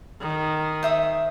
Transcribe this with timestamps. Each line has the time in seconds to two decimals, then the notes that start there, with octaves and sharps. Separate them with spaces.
0.22 D#3
0.83 C5 E5 D#6